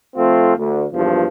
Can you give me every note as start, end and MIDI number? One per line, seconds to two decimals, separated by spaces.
0.16 0.54 41
0.16 0.54 57
0.16 0.54 60
0.16 0.54 65
0.57 0.85 38
0.92 1.25 40
0.92 1.25 43
0.92 1.25 46
0.92 1.25 53